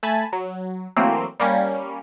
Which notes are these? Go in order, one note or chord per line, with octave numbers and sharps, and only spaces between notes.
A3 G#5 A5 B5
F#3
E3 F#3 A3 A#3 C4
G3 A#3 C#4